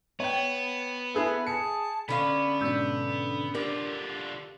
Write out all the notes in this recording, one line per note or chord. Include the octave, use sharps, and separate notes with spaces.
B3 C#5 G5
E4 G#4 A4 B4
G#4 A5 C#7
D3 B3 C#4 F5 B5
G#2 B2 D4 E6 G6
D3 D4 F4 G4 A#4